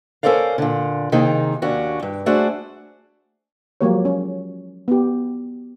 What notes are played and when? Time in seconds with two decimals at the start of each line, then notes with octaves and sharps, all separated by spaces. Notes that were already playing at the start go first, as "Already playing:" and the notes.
0.23 C#4 A4 A#4 C5 D5 F5
0.58 A#2 D3
1.12 C3 D#3 A#3 D#4 G#4
1.62 D#2 C#4 D4 F#4
2.02 G2
2.26 A3 D4 F#4 G#4 C5
3.81 F3 F#3 G#3 A#3 G4 C#5
4.05 C#4
4.88 B3 G4